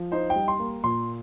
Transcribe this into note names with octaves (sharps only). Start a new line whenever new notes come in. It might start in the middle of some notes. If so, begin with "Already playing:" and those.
Already playing: F3
D#4 C5
G5
G3
C6
A#3
A#2 C6